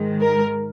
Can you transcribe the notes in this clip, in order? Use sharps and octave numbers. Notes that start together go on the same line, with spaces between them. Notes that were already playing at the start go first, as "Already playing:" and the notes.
Already playing: G#2 D#3 G#3
A#4